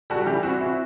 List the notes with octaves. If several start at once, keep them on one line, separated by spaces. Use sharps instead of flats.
G3 F#4 A4
E3 G4
C4 F#4
E4 F#4